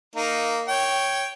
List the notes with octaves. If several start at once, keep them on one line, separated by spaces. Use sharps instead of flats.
A#3 D#4
C#5 G5